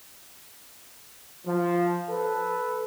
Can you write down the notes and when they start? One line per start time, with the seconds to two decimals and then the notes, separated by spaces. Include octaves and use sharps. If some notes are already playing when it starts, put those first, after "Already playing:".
1.46 F3
2.09 A4 B4